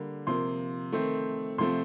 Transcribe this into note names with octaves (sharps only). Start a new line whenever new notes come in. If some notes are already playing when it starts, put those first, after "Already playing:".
Already playing: D3 G3 A#3
C3 F3 A#3 C6
D#3 A3 C4
C3 F3 A3 C4 C6